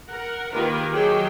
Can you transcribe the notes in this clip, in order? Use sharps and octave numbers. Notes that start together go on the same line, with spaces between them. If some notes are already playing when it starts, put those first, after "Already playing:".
A#4 F#5
D#3 A#3 F4 G4 A#4 B4
D#3 F#3 G4 G#4 G5